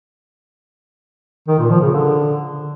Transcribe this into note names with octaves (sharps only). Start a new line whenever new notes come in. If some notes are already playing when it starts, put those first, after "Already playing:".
D#3
A#2
F3
C#3
D3